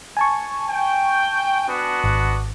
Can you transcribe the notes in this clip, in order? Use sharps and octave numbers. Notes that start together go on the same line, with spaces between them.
G#5 A5 C#6
G5
B3 D4 F#4
G#1